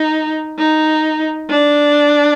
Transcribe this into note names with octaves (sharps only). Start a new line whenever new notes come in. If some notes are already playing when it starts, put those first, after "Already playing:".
Already playing: D#4
D#4
D4